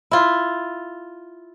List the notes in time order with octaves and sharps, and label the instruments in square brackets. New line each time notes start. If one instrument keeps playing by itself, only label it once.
[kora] E4 F4